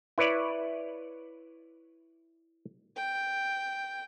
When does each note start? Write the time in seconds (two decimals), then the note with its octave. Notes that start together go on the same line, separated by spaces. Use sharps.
0.18 E4 B4 C#5 D5
2.96 G5